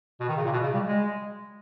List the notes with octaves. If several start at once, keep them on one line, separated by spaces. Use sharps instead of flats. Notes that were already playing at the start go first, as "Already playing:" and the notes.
B2
D#3
C#3
A#2
B2
C#3
G3
G#3